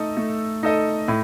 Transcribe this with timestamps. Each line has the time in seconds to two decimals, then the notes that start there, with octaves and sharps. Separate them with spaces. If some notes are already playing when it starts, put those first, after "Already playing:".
Already playing: A3 D#4 A4 D#5
0.17 A3
0.63 D#4 A4 D#5
1.08 A2